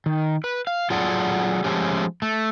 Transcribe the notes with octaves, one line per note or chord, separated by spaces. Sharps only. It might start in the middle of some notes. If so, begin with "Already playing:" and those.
D#3
B4
F5
F#3 F4 G#4 A4 D5 F#5
F3 G#3 A3 C#4 G4
A3